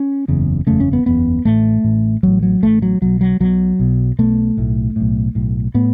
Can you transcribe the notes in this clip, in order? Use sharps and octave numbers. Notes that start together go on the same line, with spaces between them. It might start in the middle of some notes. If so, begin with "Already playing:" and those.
Already playing: C#4
F#1 E2 C#3
F#1 E2 C#3 A3
C#4
B3
F#1 E2 C#3 B3
A1 A2 A3
A1 A2
A1 A2 F#3
F#3
A1 A2 A3
F#3
B1 B2 F#3
F#3
B1 B2 F#3
B1 B2
B1 B2 A3
B1 A2
B1 A2
B1 A2
A2 B3